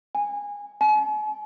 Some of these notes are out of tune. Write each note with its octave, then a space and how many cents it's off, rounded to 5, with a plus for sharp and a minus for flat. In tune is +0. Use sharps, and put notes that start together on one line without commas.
G#5 -20
G#5 +45